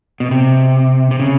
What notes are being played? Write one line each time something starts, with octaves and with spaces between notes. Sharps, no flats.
B2
C3
C3
C#3